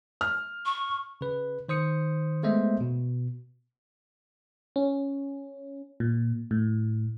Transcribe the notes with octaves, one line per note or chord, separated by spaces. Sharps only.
F6
C#6
C#3 B4
D#3 C5 D#6 C#7
G#3 A3 B3 C5 D#5 E5
B2
C#4
A#2
A2